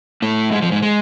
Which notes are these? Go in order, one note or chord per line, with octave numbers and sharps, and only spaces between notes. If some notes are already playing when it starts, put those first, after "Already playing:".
A2 A3
G#2 G#3
F2 F3
G#2 G#3
G#3